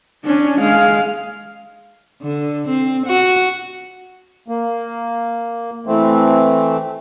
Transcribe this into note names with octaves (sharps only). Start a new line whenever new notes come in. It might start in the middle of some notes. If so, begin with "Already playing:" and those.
C#4 D4
G#3 F5
D3
C4
F#4
A#3
E3 A3 C4